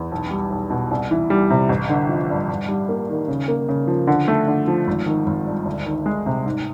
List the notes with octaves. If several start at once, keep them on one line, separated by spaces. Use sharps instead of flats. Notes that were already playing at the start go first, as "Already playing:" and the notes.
Already playing: E2
B1
G3
B1
B2
C2
E3
G3
C3
A1
D3
F3
G2
G2
G3
A#3
D#3
C#3
A#3
C#3
F3
D3
A3
D3
F3
G#1
D#3
G#1
G2
D2
D#3
G#3
C3
G#2